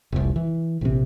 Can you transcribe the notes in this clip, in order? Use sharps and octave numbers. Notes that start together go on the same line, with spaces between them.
F1 C2
E3
A#1 C3